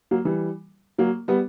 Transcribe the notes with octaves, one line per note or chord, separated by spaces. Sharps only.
F#3 A#3
E3 G3
F#3 A#3
G3 B3